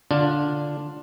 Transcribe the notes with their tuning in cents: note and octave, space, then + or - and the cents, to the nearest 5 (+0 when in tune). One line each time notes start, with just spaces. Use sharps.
D3 -5 D4 +0 F4 +0